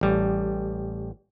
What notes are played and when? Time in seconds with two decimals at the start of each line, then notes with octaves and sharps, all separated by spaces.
0.01 A1 G3